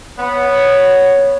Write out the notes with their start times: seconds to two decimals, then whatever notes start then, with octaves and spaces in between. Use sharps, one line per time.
0.19 B3 C#5